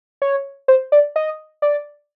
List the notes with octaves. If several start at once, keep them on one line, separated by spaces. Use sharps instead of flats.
C#5
C5
D5
D#5
D5